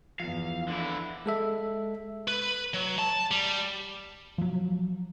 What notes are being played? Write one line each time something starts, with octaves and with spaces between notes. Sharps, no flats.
E2 F3 F5
D3 E4
G#3 A4 E5
B4
F#3
A5
G3
F3 F#3